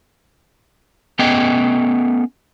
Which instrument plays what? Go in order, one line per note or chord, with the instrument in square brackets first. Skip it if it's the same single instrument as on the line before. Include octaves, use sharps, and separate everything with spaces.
[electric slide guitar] A3 B3 C#4 D#5 G5